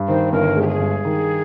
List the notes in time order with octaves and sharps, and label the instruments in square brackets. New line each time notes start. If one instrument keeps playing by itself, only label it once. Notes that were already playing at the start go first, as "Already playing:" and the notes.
Already playing: [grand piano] G2
[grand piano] D#3 [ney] C5
[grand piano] G1 [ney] A#4
[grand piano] G#3
[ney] G4
G#4
[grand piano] G2
D#3